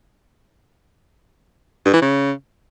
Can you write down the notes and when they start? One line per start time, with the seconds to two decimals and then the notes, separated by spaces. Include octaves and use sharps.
1.85 G2
1.93 E3
2.02 C#3